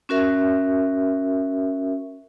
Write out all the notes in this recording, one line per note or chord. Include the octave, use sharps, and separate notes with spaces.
C#4 F#4 A#4 E5